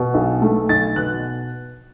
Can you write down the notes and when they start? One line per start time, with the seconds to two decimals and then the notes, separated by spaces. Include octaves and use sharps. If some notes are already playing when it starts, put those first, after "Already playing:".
Already playing: B2
0.14 B1
0.42 A3
0.69 B1 A6
0.96 B2 F#6